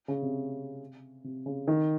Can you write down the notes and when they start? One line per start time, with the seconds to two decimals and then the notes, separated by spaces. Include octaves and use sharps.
0.08 C#3
0.22 C3
1.24 C3
1.46 C#3
1.67 D#3